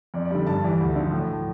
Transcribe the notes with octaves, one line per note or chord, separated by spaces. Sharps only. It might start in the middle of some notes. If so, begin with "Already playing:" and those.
F2 D5
D5
D3 G3
G2 A5
E3 G3
D2
D3 F3
A2
F3